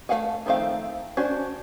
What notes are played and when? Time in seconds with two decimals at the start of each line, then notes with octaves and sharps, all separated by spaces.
0.09 A3 B4 F5 F#5 G#5
0.46 D#3 F3 A3 C4 F5
1.17 C#4 D4 F#4 C5